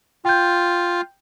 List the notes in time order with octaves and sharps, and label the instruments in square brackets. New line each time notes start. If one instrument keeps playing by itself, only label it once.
[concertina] F4 [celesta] G5 G6